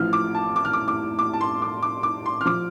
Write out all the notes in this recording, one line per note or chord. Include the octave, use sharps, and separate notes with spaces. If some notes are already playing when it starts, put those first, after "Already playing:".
Already playing: A1 A2 F3 F6
D6
A5
D6
F6
D6
D6
D6
A5
C6
D6
D6
D6
C6
F6
F3 D6